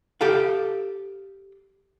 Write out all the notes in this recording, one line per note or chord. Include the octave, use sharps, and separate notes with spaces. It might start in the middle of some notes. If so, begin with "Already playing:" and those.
G4 A4 F5